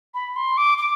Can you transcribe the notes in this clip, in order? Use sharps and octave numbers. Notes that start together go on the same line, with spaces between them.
B5
C6
D6
D6